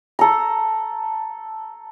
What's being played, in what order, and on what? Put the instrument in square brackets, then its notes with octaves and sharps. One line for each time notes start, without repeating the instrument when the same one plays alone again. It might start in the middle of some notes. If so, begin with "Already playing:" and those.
[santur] A4 A#5